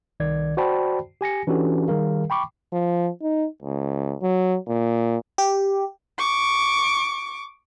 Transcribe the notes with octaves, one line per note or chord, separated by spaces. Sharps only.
C2 D#3 D5 G#6
F#4 C5 D5 G5 A5 B5
G4 G#5 A#6 C#7
E3 C#4 D4 F#4 G4 A4
D#3 G3 G#4 A#4 F5
G5 B5 C#6 D6
F3
D#4
C#2
F#3
A#2
G4
C#6 D6